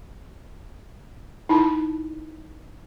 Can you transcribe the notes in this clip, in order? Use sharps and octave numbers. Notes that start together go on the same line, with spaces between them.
D#4 E4 A5 B5